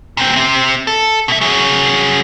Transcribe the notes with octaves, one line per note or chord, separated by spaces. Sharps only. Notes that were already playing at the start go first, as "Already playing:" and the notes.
A#2 C4
C4 E5
A4
B2 E5
F#3 G#4